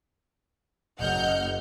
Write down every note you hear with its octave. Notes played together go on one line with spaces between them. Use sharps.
F#1 D#5 F#5 F6 G6